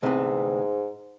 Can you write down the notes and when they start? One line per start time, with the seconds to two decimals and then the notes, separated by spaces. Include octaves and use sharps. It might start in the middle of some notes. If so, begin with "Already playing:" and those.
0.03 D2 G#2 C3 E3 B3